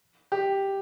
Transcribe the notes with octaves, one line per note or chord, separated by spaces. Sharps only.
G4